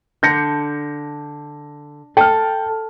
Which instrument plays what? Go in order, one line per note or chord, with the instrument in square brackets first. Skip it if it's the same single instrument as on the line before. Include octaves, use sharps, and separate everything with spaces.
[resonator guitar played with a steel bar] D3 [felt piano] G6 A#6 C#7
[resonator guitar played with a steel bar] A4 [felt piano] G5 F6